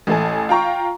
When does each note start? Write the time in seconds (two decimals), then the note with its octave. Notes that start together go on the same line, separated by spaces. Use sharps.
0.07 A1 A3 A4 G#5
0.49 F4 G5 A#5 C#6